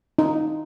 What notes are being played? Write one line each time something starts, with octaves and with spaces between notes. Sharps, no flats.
D#4